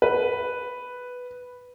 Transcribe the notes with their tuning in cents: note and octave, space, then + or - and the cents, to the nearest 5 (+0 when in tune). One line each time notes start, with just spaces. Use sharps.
B4 +0